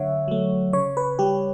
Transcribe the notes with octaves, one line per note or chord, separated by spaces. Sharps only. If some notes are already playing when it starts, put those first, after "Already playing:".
Already playing: D3 F#3 A3 C#5 E5 F#5
F#3 A3
C#3 C#5
B4
G3 G4